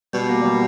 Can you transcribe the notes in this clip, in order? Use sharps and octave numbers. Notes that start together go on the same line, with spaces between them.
B2 G3
A#3
G3